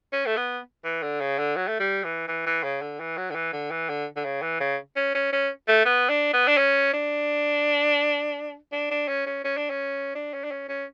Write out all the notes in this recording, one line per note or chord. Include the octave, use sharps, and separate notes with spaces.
C#4
A3
B3
E3
D3
C#3
D3
F#3
A3
G3
E3
E3
E3
C#3
D3
E3
F#3
D3
E3
D3
E3
D3
D3
C#3
E3
C#3
C#4
C#4
C#4
A3
B3
D4
B3
D4
C#4
D4
D4
D4
C#4
C#4
C#4
D4
C#4
D4
C#4
D4
C#4
C#4